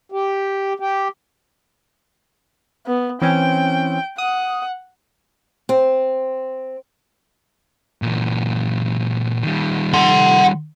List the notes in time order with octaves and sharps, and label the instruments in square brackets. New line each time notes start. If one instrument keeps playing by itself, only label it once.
[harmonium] G4
G4
[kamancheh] B3
[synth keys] E3 C4 C#4 [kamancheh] G5
[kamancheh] F#5 [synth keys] D#6
[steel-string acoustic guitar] C4
[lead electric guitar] A#2 E3
D#3 G3
[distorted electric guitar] F#5 C6